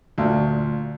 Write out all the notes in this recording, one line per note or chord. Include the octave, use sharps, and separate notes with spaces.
D2 A#2